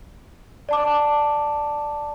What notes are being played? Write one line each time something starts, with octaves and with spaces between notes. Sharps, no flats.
D5 A5 D6